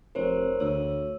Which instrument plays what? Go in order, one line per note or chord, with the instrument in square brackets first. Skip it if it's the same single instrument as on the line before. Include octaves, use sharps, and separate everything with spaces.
[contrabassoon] F1 [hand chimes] A#4 C5 C#5
[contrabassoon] D2 [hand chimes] C#5 E6